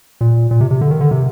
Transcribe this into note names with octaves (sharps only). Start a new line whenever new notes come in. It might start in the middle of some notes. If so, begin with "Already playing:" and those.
A#2
A#2
C3
C3
D3
D#3
D3
C3